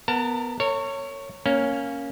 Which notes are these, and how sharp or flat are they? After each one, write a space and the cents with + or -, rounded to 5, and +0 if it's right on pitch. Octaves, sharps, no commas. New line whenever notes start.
B3 +0 A#4 -5 A5 +30
A#4 -45 C#5 -5
A#3 +0 C#4 +0